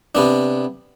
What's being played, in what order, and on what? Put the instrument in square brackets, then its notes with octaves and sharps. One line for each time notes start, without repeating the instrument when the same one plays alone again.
[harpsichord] C3 B3 D4